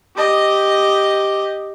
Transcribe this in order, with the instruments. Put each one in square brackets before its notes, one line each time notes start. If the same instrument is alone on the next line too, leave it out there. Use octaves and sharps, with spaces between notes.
[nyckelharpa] G4 D#5